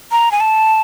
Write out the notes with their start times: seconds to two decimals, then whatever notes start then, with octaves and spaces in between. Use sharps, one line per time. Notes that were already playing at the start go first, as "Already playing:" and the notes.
0.12 A#5
0.32 G#5
0.40 A5